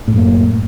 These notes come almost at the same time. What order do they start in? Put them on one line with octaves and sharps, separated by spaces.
A2 F#2 A#3